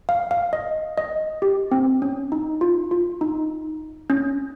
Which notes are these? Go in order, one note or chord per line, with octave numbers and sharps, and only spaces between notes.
F5
F5
D#5
D#5
G4
C4
C#4
D#4
F4
F4
D#4
C#4